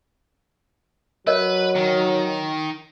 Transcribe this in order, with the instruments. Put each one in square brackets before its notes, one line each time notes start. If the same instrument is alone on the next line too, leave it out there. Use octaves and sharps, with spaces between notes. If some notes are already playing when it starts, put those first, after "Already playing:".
[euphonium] F#3 [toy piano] A#4 C#5 D#5 [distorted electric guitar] B4
[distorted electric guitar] D#3